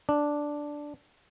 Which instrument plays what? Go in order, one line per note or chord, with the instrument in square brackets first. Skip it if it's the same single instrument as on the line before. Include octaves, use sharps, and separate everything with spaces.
[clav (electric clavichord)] D4